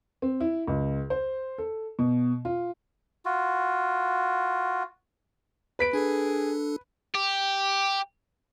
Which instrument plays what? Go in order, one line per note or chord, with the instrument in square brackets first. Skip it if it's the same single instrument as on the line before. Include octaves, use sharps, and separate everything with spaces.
[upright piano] C4
E4
C#2
C5
A4
B2
F4
[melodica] F4 F#4
[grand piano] B4 B6 D7
[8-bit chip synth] D4 A4 [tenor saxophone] G#4
[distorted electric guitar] G4